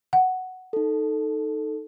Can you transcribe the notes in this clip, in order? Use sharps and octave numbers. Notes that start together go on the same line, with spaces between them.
F#5
D#4 A4